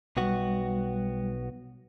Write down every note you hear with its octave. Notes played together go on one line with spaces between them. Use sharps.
B1 G3 B3 F#4